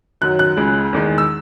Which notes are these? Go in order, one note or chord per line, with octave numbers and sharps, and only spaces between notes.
F#2 D#3 F#3 F#6
F#6
C#2 C#3 G#3
E2 D#3 G#3
E6